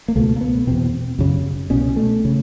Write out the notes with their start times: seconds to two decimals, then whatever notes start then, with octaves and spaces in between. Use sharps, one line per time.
0.08 A#3
0.15 C#2 B2 A3
0.36 A#3
0.41 B3
0.67 E2 B2 C4
1.19 F#2 C#3
1.70 C2 B2 C#4
1.96 A3
2.25 C#3